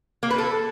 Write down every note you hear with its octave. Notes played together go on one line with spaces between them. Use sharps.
A#3
B4
A4